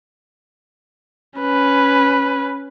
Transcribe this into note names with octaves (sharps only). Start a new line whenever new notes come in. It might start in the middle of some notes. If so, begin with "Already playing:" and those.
C#4 B4